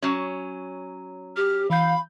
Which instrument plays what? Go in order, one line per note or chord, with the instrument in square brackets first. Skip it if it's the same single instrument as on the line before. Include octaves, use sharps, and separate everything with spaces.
[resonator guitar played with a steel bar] F#3 C#4
[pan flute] G4 [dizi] F6
[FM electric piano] E3 G6 [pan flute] F5 [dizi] B5